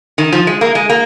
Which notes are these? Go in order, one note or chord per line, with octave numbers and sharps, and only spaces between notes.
D#3
F3
G#3
A#3
G#3
A#3